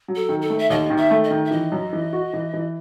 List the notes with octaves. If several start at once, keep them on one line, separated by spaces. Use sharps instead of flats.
F#3
A4
D#3
A4
A3
E5
D#2 D#5
D#3
E5
A3
D#5
D#3
E5
E3 D#5
F#2
E3
F#4
E3
E3